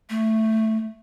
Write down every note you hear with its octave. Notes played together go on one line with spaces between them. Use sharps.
A3